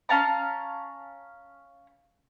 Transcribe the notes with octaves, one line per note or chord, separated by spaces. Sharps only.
C#4 F5 A5 A#5